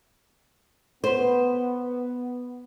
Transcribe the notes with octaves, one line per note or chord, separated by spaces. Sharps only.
B3 B4 C5